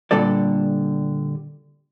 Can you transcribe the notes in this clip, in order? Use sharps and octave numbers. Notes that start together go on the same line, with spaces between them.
A#2 D3 G3 A4 D5